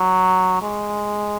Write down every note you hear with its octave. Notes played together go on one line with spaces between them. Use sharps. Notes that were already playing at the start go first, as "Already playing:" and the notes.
Already playing: F#3
G#3